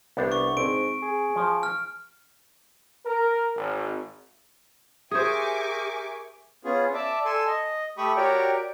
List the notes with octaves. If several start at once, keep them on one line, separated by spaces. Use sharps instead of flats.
C2 B3 D4 C5
C#6
G#2 C4 D7
G#4
F3
F6
A#4
G#1
G4 G#4 A#4 C5 E5 G#5 C#6 D6
B3 C#4 F4 G#4
D5 E5 A5
A4 G#5 C6 E6
D#5
A3 G4 B5 C#6 D#6
F#4 G4 A#4 C#5 D5 G5